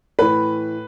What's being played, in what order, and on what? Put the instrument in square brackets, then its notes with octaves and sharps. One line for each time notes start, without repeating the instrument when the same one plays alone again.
[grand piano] A2 E3 B4 B5